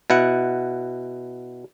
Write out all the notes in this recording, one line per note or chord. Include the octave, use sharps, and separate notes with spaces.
B2 E4 F#5